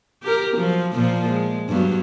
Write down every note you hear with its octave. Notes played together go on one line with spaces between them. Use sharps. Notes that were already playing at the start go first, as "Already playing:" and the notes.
G4 A#4
F3 F#3
A#2 F3 A#3
G#3
G2 F#3 B3